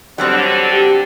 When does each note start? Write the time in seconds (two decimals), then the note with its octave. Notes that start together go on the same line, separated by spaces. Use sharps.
0.18 D3 F#3 G3 C4
0.70 G4